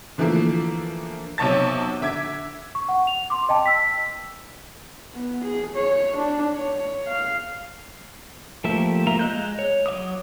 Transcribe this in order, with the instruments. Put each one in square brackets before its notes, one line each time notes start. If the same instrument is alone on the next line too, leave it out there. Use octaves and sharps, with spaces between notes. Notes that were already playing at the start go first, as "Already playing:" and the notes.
[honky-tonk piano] D3 E3 F3 A3 A#3
B1 C3 C#5 A5 A6
D3 E5 D6 G#6
[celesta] C#6
F#5
F7
C6 D6
D#5 G5 A5
E6 B6
[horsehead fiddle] B3
G#4
C#5
D4
C#5
F5
[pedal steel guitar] F3 A3 A#3 G4 E5
A#3 F4 E5 A#5
G#3 D#5 F#6 G6
C#5
F#3 E5 D6 D#6